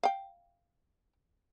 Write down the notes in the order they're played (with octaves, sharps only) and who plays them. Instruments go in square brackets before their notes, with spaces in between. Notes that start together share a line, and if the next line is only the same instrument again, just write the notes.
[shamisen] F5 G5